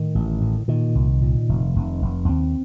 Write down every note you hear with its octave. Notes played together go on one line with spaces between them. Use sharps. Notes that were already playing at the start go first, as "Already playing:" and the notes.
Already playing: A2 D#3
A1
A2
A#2 D#3
C2
A#2
F1
F1
F1
D#2 C4